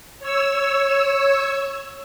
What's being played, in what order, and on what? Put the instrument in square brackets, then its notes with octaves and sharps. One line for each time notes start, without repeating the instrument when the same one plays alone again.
[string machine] C#5 E6